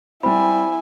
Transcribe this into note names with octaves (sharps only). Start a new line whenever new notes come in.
G3 C4 E4 G#5 B5